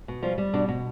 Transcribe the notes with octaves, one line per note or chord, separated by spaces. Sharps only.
B2
F3 G3 F4
G3
B2 D4 D5
B2